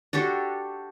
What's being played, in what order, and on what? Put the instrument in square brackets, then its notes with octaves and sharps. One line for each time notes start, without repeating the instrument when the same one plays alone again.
[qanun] D4 F#4 G4 A4